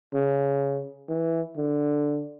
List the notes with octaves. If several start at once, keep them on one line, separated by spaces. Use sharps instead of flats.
C#3
E3
D3